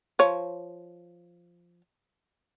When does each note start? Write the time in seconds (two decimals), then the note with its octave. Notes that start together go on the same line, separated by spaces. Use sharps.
0.19 F3 C#5